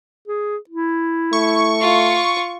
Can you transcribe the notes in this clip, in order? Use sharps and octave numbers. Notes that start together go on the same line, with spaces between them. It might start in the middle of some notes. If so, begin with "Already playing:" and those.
G#4
E4
A3 C#6
F4